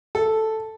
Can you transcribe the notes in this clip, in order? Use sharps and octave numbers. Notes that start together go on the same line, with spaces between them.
A4